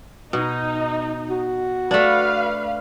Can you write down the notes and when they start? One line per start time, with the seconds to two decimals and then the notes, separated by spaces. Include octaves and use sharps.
0.33 B2 D#4
1.30 F#4
1.91 A3 D4 B4 F5